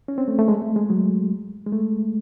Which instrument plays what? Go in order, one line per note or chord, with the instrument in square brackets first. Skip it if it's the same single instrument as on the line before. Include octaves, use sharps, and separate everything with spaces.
[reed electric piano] C#4
C4
A3
A3
G#3
A3
G#3
F#3
G#3
A3